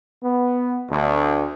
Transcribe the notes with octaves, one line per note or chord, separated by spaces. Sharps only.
B3
D2